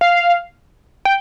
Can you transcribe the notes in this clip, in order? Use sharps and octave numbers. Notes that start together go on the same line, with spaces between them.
F5
G5